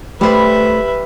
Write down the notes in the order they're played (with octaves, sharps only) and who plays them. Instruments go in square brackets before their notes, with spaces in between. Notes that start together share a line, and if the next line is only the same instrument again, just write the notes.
[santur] G3 B5 [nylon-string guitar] A3 C5 [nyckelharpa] B4 E5